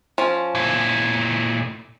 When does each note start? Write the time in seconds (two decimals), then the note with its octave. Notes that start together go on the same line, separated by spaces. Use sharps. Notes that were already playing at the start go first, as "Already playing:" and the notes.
0.18 F3 C#4
0.55 A#2 E4